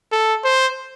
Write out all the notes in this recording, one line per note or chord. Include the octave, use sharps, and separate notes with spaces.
A4
C5